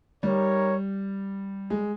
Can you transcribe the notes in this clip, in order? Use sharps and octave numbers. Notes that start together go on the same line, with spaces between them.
G3 D#4 G4 A#4 C#5
G#3